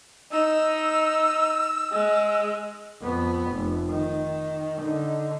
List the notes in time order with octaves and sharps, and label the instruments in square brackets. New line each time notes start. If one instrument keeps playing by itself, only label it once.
[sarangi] D#4 [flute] E6
[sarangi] G#3
[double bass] F2 B3
F1
D#3
D3 D#4